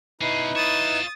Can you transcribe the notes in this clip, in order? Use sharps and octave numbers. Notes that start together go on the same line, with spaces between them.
B2 C#4 D#4 E4 B4 C7
F4 C#5 D#6 A6 E7